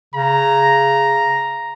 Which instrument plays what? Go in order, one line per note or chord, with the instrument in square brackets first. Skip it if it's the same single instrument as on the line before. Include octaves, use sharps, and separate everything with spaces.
[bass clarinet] C#3 [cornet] A#5